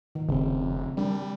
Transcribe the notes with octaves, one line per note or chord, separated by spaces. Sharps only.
D#3
F1 C#3 C4
G3 D4 A#4